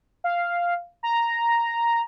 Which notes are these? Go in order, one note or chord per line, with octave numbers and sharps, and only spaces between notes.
F5
A#5